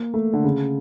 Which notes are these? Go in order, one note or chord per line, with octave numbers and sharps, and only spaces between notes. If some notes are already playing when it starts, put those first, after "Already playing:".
Already playing: A#3
A3
D3
C#3